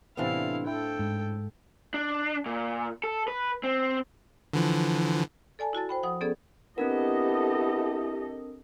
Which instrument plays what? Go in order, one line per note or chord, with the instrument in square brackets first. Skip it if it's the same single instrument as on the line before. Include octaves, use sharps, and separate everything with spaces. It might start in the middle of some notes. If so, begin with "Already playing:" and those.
[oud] A2 C4 D4 [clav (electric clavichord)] C3 E3 B3 [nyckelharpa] E4 F5
[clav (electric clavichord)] E4 [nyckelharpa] A4 G5
[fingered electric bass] G#2
[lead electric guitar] D4
A#2
A4
B4
C4
[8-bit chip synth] D3 E3 F3
[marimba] A4 D5 G#5 A5
E4 F#4 A5 A6
C5 G5 B5
F3 F#5 D#6
B3 C#4 G#4 A4 D5
[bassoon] B3 [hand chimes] C4 D4 A#4 [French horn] E4 [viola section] G4 A4 D#5